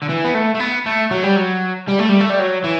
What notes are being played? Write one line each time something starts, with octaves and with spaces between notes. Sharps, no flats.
D3
E3
B3
A3
A3
B3
A3
F#3
G3
F#3
G3
A3
G3
A3
G3
F#3
E3